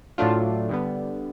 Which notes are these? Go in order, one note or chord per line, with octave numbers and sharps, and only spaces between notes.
A2 F#3 A3 D4 F4
G2 D3 G3 B3